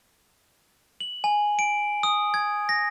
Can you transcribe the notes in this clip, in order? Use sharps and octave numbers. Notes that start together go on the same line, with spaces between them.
F#7
G#5
D7
D#6
G#6
A#6